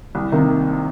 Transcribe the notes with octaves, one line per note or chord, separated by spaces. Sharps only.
C2
C3 D#3 A#3